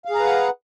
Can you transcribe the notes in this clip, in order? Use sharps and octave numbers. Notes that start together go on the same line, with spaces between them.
G#4 B4 F5 F#5 A#5